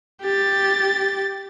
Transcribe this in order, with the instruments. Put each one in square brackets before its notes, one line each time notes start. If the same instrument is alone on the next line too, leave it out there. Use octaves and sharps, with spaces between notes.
[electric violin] G4 A6